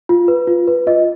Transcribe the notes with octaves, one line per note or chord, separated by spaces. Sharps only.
F4
B4
F4
B4
F4 D#5